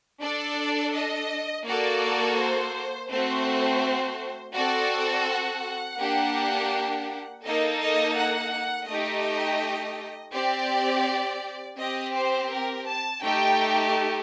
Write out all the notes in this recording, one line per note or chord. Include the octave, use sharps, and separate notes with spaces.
D4 A4 D5
D#5
A#3 F#4 A4 D5
C5
A3 C4 F#4 C5
C4 F#4 A4 D5
F#5
A#3 D4 G4
A#3 D#4 A4 D#5
D#5
F#5
A3 D#4 G4 D#5
C4 G4 D5
C4 G4 D#5
C5
A#4
A5
A3 D#4 G4 G5